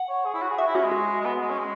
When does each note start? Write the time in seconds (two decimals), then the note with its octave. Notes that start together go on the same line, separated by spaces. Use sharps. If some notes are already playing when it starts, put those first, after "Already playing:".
Already playing: F#5
0.09 C#5
0.25 G#4
0.34 E4
0.41 F#4
0.50 G#4
0.58 F#4 E5
0.66 E4
0.75 C#4 F#4
0.83 G#3
0.92 F#4
1.20 G#3
1.25 B3
1.41 G#3
1.50 C#4
1.58 G#3